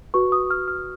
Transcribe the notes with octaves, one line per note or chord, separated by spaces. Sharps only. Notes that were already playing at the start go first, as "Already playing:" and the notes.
F#4 B4 C#6
D#6
F6
F6